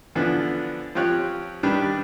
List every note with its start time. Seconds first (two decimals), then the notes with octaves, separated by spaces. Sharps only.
0.15 D3 E3 F3 B3 D4
0.95 F3 C4 F4 G4 C#5 F#6
1.63 D#3 G3 D4 G4 B4